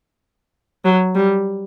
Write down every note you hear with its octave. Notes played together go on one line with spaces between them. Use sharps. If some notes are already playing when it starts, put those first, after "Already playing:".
F#3
G3